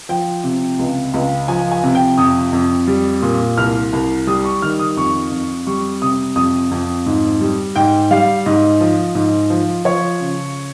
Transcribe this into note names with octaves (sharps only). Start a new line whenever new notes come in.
F3 G5
C3
C#2
C#2
F3 G#5
G#5
C3
G5
F2 D#6
F2
G3
A#2
C2 F6
C2
G3 D#6
C#6
D#3 F6
D#6
F2 C#6
F2
G3 C#6
C3 D#6
F2 D#6
F2
G#2
G3
G#2 G5
G3 F5
G#2 D#5
F3
G#2
F3
F3 C#5
C#3